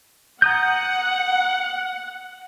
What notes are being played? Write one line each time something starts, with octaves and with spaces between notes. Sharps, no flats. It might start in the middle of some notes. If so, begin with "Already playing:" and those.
F#5 A#5 D#6 G6